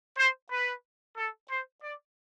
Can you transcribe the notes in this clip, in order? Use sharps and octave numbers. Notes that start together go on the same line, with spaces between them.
C5
B4
A4
C5
D5